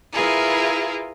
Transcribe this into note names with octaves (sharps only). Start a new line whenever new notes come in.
E4 F4 G#4 A#4 B4